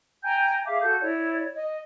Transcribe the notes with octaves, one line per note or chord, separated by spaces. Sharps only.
G5 G#5 A#5 G6
G#4 E5 F5 D6
F#4 A4 G6
E4 C#5 D5
D#5